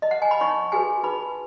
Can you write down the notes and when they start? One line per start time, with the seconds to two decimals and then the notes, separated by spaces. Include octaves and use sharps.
0.02 D#5
0.11 F#5
0.22 G#5
0.31 B5
0.41 D#4 C#5 C#6
0.72 F#4 G#4 B4 G#5
1.03 D#4 B4 B5